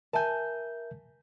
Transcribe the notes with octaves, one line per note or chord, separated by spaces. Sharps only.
A#4 E5 G#5 A5 G6